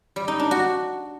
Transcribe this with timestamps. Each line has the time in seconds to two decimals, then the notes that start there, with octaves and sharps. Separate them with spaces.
0.16 G3
0.28 D#4
0.39 D4
0.51 F#4